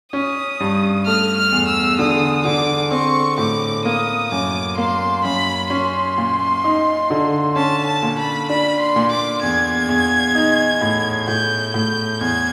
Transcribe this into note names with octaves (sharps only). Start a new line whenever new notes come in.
C#4 D#6
G2
A3 F6
F6
E2
E6
D3 D#6
D3 D6
C4 C#6
A2 D6
A#3 D#6
F#2 D6
A#3 C6
F#2 B5
C#4 C6
A#2
D#4
D3
C#4 A5
A5
A#2
B5
D4 B5
C6
A#2
D6
E2 G#6
E2
D#4
A2
A2 G6
A2 G6
E2 G#6